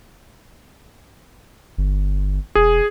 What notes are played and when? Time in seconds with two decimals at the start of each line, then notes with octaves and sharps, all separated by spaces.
1.78 G1
2.55 E1 G#4